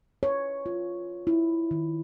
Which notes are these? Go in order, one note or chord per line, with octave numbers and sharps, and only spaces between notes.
C#5
F4
E4
D#3